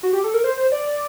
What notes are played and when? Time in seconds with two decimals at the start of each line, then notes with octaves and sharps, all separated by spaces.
0.03 F#4
0.13 G4
0.24 A4
0.34 A#4
0.44 C5
0.57 C5
0.72 D5